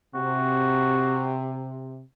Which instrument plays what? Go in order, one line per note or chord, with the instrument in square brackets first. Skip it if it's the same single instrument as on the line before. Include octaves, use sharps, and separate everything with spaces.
[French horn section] C3 [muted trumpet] F#4